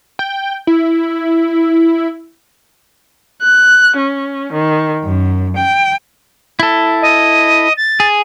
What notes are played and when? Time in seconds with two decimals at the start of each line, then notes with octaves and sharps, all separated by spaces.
0.19 G5
0.67 E4
3.43 F#6
3.97 C#4
4.53 D#3
5.04 F#2
5.56 G5
6.60 E4 A4
7.02 D#5
7.77 A6
8.00 G#4